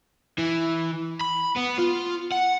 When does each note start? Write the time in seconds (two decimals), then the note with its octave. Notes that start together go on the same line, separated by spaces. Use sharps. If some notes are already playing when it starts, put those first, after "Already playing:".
0.38 E3
1.21 B5
1.57 B3
1.79 F4
2.32 F#5